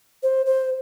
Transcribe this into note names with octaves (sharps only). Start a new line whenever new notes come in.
C5
C5